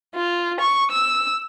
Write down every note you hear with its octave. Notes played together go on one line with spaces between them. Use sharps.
F4
C#6
E6